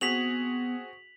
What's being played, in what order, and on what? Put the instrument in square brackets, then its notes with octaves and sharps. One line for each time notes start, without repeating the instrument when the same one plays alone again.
[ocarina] B3 [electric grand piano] C4 F#4 G#4 [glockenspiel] B6 F7 F#7